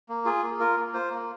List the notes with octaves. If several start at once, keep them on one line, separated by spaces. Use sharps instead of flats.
A#3
F4 G#4
A#3
F4 A#4
A#3
F4 C5
A#3